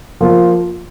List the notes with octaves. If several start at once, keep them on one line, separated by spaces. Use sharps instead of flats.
F3 A#3 F4